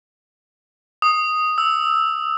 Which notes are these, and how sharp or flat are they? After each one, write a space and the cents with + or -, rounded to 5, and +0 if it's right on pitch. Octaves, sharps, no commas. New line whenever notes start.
D#6 +0
E6 -5